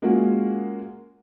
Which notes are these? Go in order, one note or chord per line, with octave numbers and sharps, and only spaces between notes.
G#3 A#3 C#4 F4 F#4 G#4